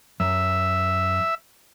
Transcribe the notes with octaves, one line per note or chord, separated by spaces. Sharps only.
F#2 E5